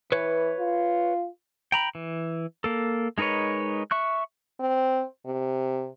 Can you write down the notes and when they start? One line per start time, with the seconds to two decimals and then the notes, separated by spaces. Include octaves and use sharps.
0.12 E3 B4 C#5
0.60 F4
1.72 G5 A#5 B5
1.95 E3
2.64 A#3 A4
3.18 G#3 D#4 A#4 B4 C#5
3.91 E5 C#6 F#6
4.60 C4
5.26 C3